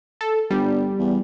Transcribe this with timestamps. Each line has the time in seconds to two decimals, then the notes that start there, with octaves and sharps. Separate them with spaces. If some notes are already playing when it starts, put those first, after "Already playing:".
0.21 A4
0.51 G1 G3
0.99 E2